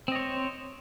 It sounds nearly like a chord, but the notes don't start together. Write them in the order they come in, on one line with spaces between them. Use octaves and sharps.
C4 D#5 C#5 C5